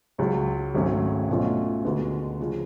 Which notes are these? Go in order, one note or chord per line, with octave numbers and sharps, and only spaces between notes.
C#2 C#3 F#3
G#1 G#2 F#3 A3 C#4
B2 F#3 A3 C#4 F4
D2 D3 G#3 B3 F#4
C#3 F3